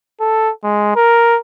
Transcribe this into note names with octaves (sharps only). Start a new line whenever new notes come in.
A4
G#3
A#4